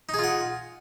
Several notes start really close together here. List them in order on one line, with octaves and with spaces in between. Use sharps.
D#4 G#4 F4 F#5